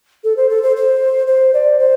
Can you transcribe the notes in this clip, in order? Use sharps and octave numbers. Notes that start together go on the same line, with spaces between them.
A4
C5
A4
C5
C5
C5
D5
C5